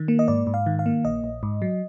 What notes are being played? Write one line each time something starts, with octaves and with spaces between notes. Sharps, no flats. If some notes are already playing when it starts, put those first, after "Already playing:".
Already playing: D#3
A#3
D#5
G#2 D5
G#2
F5
D#3
F5
A#3
A#1 D#5
A#1
G#2
F#3